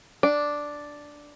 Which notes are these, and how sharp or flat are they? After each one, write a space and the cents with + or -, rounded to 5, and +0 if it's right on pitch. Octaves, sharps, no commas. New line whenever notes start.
D4 +0 D5 +0